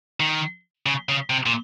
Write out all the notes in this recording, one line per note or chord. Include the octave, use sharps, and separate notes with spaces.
D#3
C#3
C#3
C3
A#2